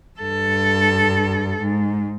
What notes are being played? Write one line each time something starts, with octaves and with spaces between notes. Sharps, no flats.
G2 A4
G#2